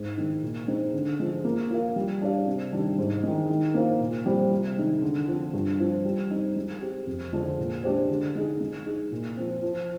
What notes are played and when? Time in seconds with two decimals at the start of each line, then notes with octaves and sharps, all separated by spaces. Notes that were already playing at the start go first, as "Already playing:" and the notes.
Already playing: G#2
0.17 D#3 G#3
0.43 A#2
0.68 G#3 C4 D#4
0.94 D3
1.20 F3 G#3
1.45 A#3
1.70 F4 A#4 F5
1.96 G3
2.21 D4 G4 D5 F5
2.46 C3
2.72 D#3 G3 D4
2.98 G#2
3.24 D#3 G#3
3.49 D#3
3.74 A#3 F4 C5 F5
4.01 A#2
4.26 G3 C4 F4
4.51 C3
4.77 D#3 G#3 D#4
5.02 D3
5.28 F3 C4
5.53 G2
5.79 F3 C4 F4
6.05 G3
6.31 C4 D#4
6.56 G#3
6.81 C4 G4
7.07 F2
7.32 D3 F3 G#3 D4
7.58 A#2
7.84 G#3 D4 G4 C5
8.10 D3
8.35 G#3 D#4 G#4
8.61 G#3
8.86 D#4 G#4
9.11 A#2
9.37 F3 C4
9.62 F3